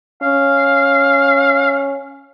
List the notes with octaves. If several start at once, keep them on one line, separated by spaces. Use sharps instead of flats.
C#4 F5